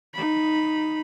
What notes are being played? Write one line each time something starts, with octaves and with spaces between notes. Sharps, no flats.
D#4 B5